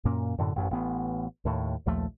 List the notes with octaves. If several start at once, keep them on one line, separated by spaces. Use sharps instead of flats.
F#2 A#2 A#3 C#4
F#2 A2 D3
A1 F#2
A1 B3
D#2 A2
A#1 D#2 F3 A3